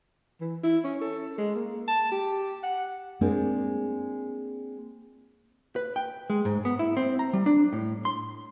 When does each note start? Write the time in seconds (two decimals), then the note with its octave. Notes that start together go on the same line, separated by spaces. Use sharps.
0.41 E3
0.63 E4
0.84 C#4
1.01 A4
1.38 G#3
1.56 A#3
1.88 A5
2.11 G4
2.63 F#5
3.21 G#3 A#3 C4 D4 F4 G#4
5.76 B4
5.96 G5
6.30 G#3
6.45 G#2
6.65 B3
6.79 E4
6.97 C4
7.19 A#5
7.33 G3
7.46 D4
7.73 A2
8.05 C6